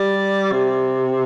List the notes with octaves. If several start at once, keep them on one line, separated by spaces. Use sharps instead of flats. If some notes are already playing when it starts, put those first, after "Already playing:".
Already playing: G3
C3